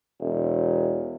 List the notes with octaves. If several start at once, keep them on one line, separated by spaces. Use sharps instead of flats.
E1